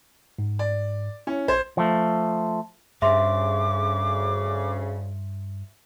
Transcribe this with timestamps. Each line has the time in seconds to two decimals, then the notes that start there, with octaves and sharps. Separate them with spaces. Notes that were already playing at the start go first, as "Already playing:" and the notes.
0.39 G#2
0.59 D5
1.27 C#4 E4
1.48 A#1 C5 G#6
1.77 F3 A3
3.02 D2 G2 C#3 E5 C6 D6